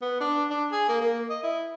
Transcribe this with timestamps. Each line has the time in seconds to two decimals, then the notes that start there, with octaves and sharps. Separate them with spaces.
0.02 B3
0.20 D4
0.50 D4
0.72 G#4
0.89 A#3
1.01 A#3
1.30 D#5
1.43 E4